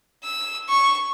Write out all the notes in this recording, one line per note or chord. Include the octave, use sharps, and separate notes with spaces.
E6
C#6